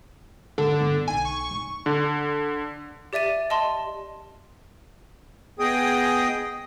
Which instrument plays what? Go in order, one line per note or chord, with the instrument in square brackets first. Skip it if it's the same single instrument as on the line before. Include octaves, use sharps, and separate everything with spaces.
[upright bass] F#1 G2 [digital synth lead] D3
[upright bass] G2 B3
[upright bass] B1 [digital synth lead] G#5
[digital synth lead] C#6
[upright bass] F1
[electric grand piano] D3
[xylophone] G4 D5 E5 A6 D#7
D#5 A5 C6
[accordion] B3 G#4 D#5 G5 D#6